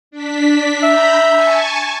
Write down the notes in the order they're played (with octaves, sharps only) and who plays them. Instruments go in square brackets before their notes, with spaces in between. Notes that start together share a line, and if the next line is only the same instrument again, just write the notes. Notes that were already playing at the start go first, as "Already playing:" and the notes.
[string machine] D4 B6
[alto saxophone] E5 [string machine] A#5 B5 G6
[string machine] G#5 A5 C#6